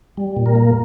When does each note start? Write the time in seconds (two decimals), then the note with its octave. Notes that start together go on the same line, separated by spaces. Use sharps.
0.17 G3
0.37 A#2
0.46 A#4
0.55 A#3